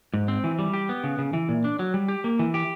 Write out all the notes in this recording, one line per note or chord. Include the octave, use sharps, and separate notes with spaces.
G#2
C4
E3
G3
G4
B3
C#3
C#3
E3
A#2
D4
F#3
G3
G4
A#3
E3
G4